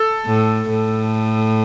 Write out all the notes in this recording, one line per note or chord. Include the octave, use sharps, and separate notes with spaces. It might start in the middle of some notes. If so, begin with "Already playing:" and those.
Already playing: A4
A2
A2